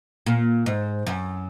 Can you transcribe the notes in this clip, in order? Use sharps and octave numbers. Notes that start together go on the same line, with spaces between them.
A#2
G#2
F#2